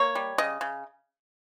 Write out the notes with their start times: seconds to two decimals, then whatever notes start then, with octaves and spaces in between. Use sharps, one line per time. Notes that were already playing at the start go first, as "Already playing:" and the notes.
Already playing: A#3 C#5
0.15 G3
0.38 C#3 D#5
0.61 C#3